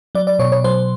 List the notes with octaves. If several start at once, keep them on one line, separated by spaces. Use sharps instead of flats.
F#3 D5
D5
B2 C#5
C#5
F#3 C5